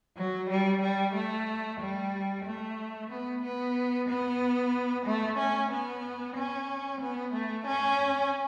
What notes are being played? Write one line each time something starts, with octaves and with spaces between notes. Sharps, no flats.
F#3
G3
G3
A3
G3
A3
B3
B3
B3
A3
C#4
B3
C#4
B3
A3
C#4